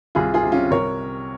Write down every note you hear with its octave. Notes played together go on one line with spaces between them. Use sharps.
C2 F4 G#4
F4 G#4
C3
C#4 F4
C2 A#4 C#5